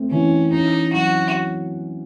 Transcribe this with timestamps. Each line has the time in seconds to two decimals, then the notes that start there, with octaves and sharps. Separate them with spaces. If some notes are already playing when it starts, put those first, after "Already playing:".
Already playing: A3 C4
0.11 E3 C#4
0.52 C#4 D#4
0.93 F#3 F#4